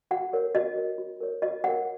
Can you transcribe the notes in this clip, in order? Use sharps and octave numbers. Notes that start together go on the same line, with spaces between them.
F#4 F#5
A#4 C#5
F#4 D#5
A#4 C#5
F#4
A#4 C#5
F#4 D#5
A#4 C#5 F#5